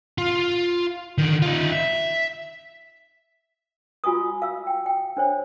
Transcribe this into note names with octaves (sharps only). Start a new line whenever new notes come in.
F4
D3 D#3
D#4 F4
E5
F4 F#4 G#5 C#6 D#6
F5 E6
G5
G5
D4 C5 C#5